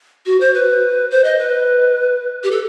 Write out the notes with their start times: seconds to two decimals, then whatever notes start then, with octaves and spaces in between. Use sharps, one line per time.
0.26 F#4
0.40 C5
0.54 B4
1.11 C5
1.24 D#5
1.39 B4
2.43 G4
2.51 A4